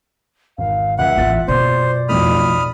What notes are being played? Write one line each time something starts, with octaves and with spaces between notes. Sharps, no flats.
G#1 F5
C#2 E5 F#5
A1 A#2 E3 F4 A6
F#2 B2 C5 D5
B1 F2 A2 B5 D#6 F6